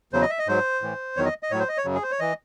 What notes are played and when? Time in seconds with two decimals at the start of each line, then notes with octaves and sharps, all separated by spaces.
0.13 E2 C#3 F#3 C5
0.22 D#5
0.30 E5
0.39 D#5
0.47 G#2 F#3 C5
0.82 A2 E3
1.16 E2 D#3 F#3 C#5
1.25 D#5
1.43 D#5
1.51 A2 F#3 C#5
1.60 C5
1.69 D#5
1.77 C#5
1.85 F#2 C#3 F#3
1.94 G#4
2.03 C5
2.11 C#5
2.19 E3 D#5